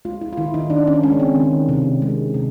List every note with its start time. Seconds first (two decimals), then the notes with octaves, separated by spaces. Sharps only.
0.05 G#3 F4
0.21 E4
0.33 F4
0.37 D#3 E4
0.54 D#4
0.70 D#3 D4
0.87 C#4
1.03 G#3 C#4
1.20 C4
1.35 D#3
1.69 C3
2.02 G#3
2.34 C3